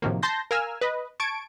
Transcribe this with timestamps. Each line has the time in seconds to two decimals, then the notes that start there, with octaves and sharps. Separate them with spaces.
0.02 A2 C3 D#3 F3 F#3 A#3
0.22 A5 C6 G6 A#6
0.51 A#4 F5 G#5 E6 F6
0.81 B4 D#5
1.20 A5 C#6 G#6 D7